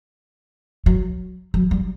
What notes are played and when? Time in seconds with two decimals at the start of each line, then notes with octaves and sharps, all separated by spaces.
0.86 F#3
1.54 F#3
1.71 G3